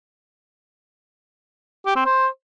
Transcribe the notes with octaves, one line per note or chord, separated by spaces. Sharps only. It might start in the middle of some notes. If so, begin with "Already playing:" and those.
G4
C4
C5